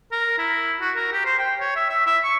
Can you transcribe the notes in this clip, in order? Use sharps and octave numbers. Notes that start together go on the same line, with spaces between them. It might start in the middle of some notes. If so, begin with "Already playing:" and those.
A#4
E4
F#4
A#4
G4
C5
G5
C#5
E5
E5
E5
C#6